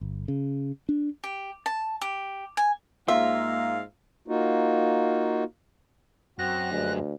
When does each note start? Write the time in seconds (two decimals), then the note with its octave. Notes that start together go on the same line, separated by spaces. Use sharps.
0.01 G1
0.28 C#3
0.89 D4
1.24 G4
1.66 A5
2.01 G4
2.57 G#5
3.08 G#2 A#3 F4 E5 F5
4.28 A#3 D#4 F4 F#4
6.39 F#2 C4 F#4 F#6 A#6
6.71 D2 G2 G#3